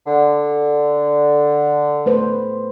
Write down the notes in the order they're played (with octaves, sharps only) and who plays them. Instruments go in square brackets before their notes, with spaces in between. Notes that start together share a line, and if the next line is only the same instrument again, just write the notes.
[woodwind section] D3
[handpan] A3 B4 C5